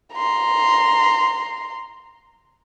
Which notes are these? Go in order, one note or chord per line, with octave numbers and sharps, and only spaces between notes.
A#5 C6